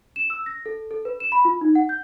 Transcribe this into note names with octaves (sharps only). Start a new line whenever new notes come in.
E7
E6
A#6
A4
A4
B4
E7
B5
F4
D#4
F#5
G6